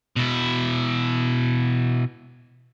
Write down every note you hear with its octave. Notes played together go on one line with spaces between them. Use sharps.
B2 E4